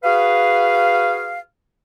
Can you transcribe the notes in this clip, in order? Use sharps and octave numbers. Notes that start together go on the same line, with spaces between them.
F#4 G#4 B4 F5